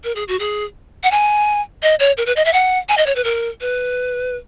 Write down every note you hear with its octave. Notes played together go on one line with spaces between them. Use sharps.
A#4
G#4
F#4
G#4
F#5
G#5
D#5
C#5
A#4
B4
D#5
E5
F#5
G#5
D#5
C#5
B4
A#4
B4